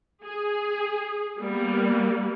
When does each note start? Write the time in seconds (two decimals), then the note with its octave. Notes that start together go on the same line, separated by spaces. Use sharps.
0.25 G#4
1.38 G3 A#3 B3